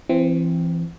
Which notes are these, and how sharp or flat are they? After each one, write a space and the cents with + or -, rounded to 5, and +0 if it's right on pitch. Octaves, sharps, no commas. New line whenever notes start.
E3 +30 C4 +0